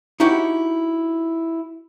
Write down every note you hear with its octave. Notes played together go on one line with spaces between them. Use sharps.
D#4 E4 F#4 G4 C#5